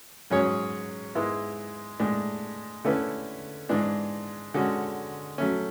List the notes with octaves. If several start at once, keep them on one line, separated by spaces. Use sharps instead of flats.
G#2 F#3 C#4 G#4 C#5
G#2 G#3 B3 E4
A2 G#3 D4
D3 A3 C#4 E4 B4
G#2 E3 G#3 D4
D3 G#3 C#4 F#4
F#3 A3 C#4